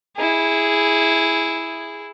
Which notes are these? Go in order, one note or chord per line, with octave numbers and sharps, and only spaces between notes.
E4 G#4